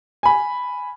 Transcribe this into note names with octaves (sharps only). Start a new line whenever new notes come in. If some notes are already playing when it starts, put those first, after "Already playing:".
G#5 B5